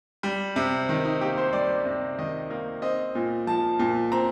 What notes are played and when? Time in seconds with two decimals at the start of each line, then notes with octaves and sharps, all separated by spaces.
0.23 G3
0.56 C3
0.89 D#3
1.05 D#4
1.21 A#3 G4
1.38 C5
1.53 G3 D5
1.85 C3
2.19 D#3 D#5
2.50 A#3
2.82 C4 D#5
3.15 A#2
3.47 F3 A5
3.79 A#2
4.12 C4 A#5